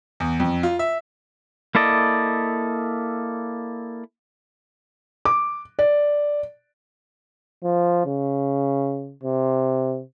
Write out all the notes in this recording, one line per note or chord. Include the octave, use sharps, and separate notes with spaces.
E2
F2
F4
E5
A#3 E4 A4 D5 D#5
D6
D5
F3
C#3
C3